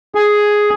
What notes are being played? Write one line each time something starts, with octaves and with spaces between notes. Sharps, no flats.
G#4